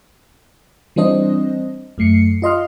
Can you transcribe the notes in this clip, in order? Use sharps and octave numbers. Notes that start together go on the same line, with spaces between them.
E3 G3 C4 D4 C5 D#5
F#2 A3 C7 C#7
F4 D#5 C6 F6